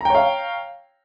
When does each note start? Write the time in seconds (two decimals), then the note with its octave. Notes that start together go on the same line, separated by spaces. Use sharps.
0.01 A#5
0.05 G5
0.10 C#5
0.15 F5